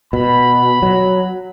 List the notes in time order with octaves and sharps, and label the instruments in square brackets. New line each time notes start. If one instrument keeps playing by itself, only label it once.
[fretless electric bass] B2 [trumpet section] B5
[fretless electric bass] F#3